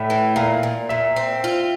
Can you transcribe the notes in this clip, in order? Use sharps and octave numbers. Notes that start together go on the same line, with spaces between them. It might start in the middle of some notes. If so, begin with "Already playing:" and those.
Already playing: A2 E5
E3
A#2 F5
A#2
A#2 E5
C4
F4